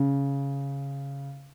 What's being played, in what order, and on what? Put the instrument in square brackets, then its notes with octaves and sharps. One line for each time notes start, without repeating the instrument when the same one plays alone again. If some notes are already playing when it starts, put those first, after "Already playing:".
Already playing: [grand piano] C#3